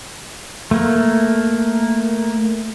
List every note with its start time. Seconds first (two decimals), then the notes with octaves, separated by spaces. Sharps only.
0.71 A3 A#3